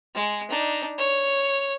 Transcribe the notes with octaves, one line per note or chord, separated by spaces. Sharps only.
G#3
D4 D#4
C#5